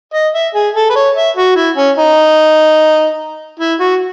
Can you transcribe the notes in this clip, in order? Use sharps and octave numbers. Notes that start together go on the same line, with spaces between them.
D#5
E5
G#4
A4
B4
C#5
E5
F#4
E4
C#4
D#4
E4
F#4